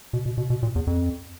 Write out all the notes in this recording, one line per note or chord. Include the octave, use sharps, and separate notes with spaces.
B2
B2
B2
B2
A#2
E2
F2